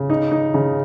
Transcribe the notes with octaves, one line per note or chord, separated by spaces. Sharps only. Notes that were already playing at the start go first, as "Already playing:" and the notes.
Already playing: C#3
D#4
D#4
C#3